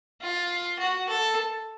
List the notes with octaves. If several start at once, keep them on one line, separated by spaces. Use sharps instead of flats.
F4
F#4
A4